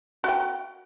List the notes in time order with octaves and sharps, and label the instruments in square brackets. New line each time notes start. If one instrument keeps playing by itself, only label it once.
[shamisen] F#4 G5